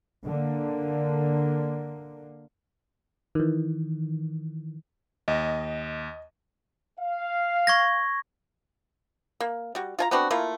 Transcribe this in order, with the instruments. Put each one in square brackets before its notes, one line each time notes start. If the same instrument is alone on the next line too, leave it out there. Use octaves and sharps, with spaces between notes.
[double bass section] D3 A#3
[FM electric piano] D#3 E3
[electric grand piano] D#2 [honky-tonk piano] D#5
[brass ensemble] F5
[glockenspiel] C#6 G#6 A#6
[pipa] A#3
G3 F#4
F4 G#5 A#5
B3 C4 D4 F#4
A3 A#3 E4 F4